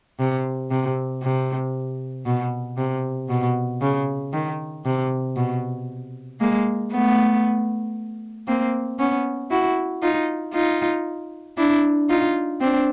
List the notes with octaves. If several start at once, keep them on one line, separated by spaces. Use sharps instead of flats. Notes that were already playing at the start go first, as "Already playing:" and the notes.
C3
C3
C3
B2
C3
B2
C#3
D#3
C3
B2
G#3 A#3
A3 B3
A#3 C4
B3 C#4
E4 F#4
D#4 F4
D#4 F4
D4 E4
D#4 F4
C4 D4